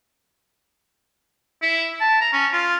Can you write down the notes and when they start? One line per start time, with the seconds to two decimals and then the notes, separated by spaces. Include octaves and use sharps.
1.62 E4
2.00 A5
2.21 A#5
2.33 C#4
2.53 F4